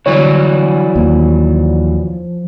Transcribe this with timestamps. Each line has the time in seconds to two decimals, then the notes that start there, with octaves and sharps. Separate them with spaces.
0.06 D3 E3 F#3 G3 C#5
0.96 D#2 F3